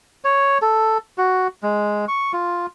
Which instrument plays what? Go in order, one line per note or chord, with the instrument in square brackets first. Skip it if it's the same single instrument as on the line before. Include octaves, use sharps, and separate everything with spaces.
[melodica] C#5
A4
F#4
G#3
C#6
F4